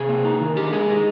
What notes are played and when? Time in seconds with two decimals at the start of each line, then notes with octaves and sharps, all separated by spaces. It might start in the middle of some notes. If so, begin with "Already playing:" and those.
Already playing: C3 G#4
0.09 A#3
0.25 D#4
0.41 D#3
0.57 D3 G4
0.73 G#3 G#4
0.88 D#4